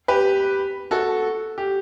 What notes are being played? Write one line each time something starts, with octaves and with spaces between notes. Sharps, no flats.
G4 B4
F#4 A4
G4